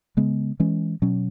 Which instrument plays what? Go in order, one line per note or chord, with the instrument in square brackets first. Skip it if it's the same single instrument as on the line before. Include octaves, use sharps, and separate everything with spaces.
[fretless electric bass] C#3 G#3 B3
E3 G#3 C#4
B2 F#3 C#4